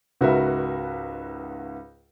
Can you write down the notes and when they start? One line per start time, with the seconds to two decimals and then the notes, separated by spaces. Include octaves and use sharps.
0.21 C#2 G#2 F#4 A#4 B4 E5